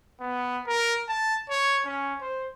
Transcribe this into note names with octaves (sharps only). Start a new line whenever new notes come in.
B3
A#4
A5
C#5
C#4
C5